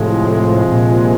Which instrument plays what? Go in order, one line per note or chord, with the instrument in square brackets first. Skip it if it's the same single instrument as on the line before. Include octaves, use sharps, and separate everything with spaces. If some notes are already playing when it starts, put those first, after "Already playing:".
Already playing: [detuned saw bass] A2 [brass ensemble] C3 F3 G#3
[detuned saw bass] A#2